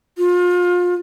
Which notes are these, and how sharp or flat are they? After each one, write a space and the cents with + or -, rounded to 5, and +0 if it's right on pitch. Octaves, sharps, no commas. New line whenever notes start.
F4 +30